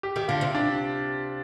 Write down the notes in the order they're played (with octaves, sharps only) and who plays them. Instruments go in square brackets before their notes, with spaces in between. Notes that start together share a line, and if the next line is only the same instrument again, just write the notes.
[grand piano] G4
[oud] D#3 [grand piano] G4
[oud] D3 [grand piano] F4
[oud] C3
[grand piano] D4